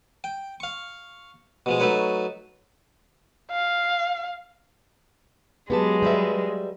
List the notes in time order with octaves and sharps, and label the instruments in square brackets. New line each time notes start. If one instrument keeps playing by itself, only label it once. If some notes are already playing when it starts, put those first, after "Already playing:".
[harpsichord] G5
F5 C#6
B2 F3 G#3
F#3 A3 D#4 B4 C#5
[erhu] F5
[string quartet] F#3 G#3 [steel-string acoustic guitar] B3 G4 A5
[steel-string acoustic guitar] G3 B4 E5